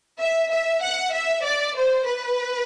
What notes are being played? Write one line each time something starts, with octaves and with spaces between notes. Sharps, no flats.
E5
E5
F#5
E5
D5
C5
B4